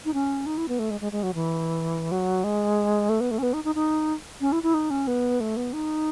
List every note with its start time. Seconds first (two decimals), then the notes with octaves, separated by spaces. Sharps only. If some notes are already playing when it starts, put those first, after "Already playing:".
0.05 D#4
0.14 C#4
0.46 D#4
0.58 E4
0.69 B3
0.79 A3
0.91 G#3
1.01 G#3
1.12 G#3
1.23 F#3
1.34 E3
2.12 F#3
2.44 G#3
3.09 A3
3.21 B3
3.31 A3
3.39 C#4
3.43 B3
3.53 D#4
3.64 D#4
3.75 D#4
4.41 C#4
4.52 E4
4.63 E4
4.74 D#4
4.90 C#4
5.07 B3
5.40 A3
5.57 B3
5.73 D#4